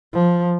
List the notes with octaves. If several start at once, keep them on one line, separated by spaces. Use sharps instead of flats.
F3